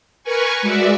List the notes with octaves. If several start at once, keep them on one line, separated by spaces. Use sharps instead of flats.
A#4 B4 G#5 C#6
G#3 F#4 D5 E5